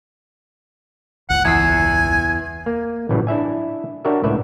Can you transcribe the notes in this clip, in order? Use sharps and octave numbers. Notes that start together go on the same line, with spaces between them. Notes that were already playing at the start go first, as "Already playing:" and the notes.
G1 C#2 F#5
E2 G#5 E6 C7
A#3
A1 A2 C#3 E3 F#3 G3
D4 E4 E5 G#5
D4 F#4 G4 A#4 C#5 E5
C#2 A2 B4 D5 E5